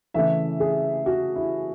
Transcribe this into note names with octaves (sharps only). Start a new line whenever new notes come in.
C#3 E3 A3 E5
G#4
F#4
E4